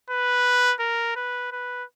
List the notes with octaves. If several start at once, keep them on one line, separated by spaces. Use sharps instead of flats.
B4
A#4
B4
B4